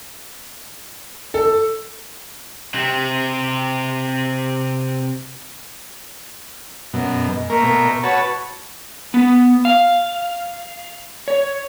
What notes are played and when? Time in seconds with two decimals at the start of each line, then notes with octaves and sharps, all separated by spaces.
1.34 A4
2.74 C3 C4
6.94 F#2 B2
7.32 G#3
7.50 A3 A#3 A#4
7.63 B2 A#4
8.03 F#4 B4 C#5 A5
9.14 B3
9.65 F5
11.28 C#5